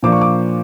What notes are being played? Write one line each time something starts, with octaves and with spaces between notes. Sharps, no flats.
A#2 F3 A#3 D4 D6
C#6
D6